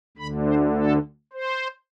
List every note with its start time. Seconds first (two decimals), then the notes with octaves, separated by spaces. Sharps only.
0.17 D2 D3 B5
0.46 C5
0.75 A4
1.33 C5